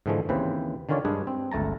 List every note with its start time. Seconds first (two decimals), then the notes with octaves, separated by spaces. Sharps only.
0.06 G#2 D3 E3 F3 G#3 A3
0.29 D#2 C#3 E3 C4 B4 C5
0.89 D3 D#3 C#4 F4 C#5 D5
1.05 G2 G#3 D4 G#4 B4
1.27 C4
1.52 G1 C#2 A3 A5 A#5